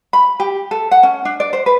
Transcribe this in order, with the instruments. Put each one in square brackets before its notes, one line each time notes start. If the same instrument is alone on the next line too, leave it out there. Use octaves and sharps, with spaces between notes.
[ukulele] B5
G4
A4
F#5
C#4
D4
D5
C5
B4